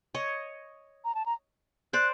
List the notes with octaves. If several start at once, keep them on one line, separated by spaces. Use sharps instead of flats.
C#5 D#5
A#5
A5
A#5
C5 D5 F#6